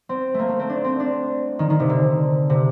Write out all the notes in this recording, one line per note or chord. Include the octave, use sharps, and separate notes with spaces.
C4
A3 A#3
A3
C4
D4
C4
D4
D#3
D#3
C3
D3
C3